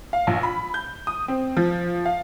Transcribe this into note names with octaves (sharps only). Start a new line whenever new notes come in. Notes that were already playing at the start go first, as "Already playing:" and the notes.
F5
A#1
B5
G6
D#6
C4
F3
F5